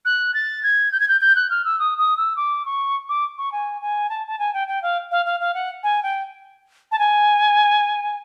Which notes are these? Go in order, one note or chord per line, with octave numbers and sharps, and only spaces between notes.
F#6
A6
G#6
G6
G#6
G6
G6
F#6
F6
E6
D#6
D#6
E6
D6
C#6
D6
C#6
G#5
G#5
A5
A5
G#5
G5
G5
F5
F5
F5
F5
F#5
G#5
G5
A5
G#5